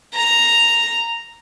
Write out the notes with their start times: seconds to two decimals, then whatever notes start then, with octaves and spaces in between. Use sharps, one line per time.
0.15 A#5